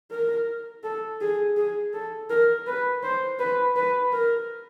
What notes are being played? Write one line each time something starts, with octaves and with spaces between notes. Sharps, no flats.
A#4
A4
G#4
G#4
A4
A#4
B4
C5
B4
B4
A#4